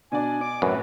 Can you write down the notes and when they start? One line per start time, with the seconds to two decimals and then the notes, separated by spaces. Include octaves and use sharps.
0.12 B2 D4 D5 G#5
0.41 D6
0.62 A#1 F#2 A2 C#4 B4